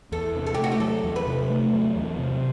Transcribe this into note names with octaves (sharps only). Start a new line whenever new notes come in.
E2 A4
C3
A4
G4
A3
F#4
G4
F#3 A4
E2
B4
C3
A3
F#3
E2
C3